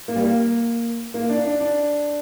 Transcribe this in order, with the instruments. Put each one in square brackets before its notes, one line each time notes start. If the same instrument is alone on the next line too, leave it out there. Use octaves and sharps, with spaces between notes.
[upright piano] A#3
G3
A#3
A#3
D4
D4
D4